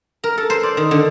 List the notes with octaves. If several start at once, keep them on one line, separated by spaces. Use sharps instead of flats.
A#4
A4
C5
D5
D#3
D3